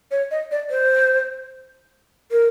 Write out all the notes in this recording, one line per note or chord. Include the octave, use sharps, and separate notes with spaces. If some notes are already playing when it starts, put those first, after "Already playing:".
C#5
D#5
D5
C5
A#4